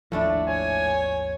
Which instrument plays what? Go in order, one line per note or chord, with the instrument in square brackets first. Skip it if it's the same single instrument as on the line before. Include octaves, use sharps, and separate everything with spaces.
[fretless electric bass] G#1 D#2 F3 [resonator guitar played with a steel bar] A2 A3 D4
[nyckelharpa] C#5 [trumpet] G#5